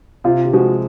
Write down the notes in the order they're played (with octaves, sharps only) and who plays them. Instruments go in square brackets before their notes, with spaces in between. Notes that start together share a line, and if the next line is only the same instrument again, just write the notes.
[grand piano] C3 [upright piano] F4
[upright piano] G4
[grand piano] F3 G#3 [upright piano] F#4